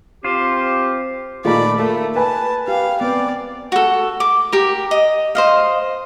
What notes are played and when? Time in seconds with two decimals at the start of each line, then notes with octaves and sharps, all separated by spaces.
0.24 C4 F4 G4 C5
1.45 A#2 D#3 A3 F4 G#4 D5 A#5 B5
1.79 A3 A#3
2.16 A#4 B4 G#5 A5
2.68 G4 F5
3.01 B3 C4 D5 G5
3.72 F#4 A4
4.20 D6
4.52 G4 A#4
4.91 D#5
5.35 C5 D#5 F5